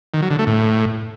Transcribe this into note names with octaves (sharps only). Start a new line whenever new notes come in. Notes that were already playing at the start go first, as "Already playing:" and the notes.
D#3
F#3
D3
A3
A2